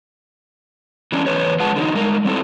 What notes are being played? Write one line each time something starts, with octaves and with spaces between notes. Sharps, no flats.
E3 G3 C#4 D4
E2 G#3 B4 C#5
F3 G#3 B4 F#5 A5
D3 F#3 D#4
G3 G#3 A#4
G3 C4 E4 A4